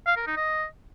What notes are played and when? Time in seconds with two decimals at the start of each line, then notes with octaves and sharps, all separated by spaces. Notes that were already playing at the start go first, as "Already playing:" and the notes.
0.07 F5
0.17 A#4
0.27 D#4
0.37 D#5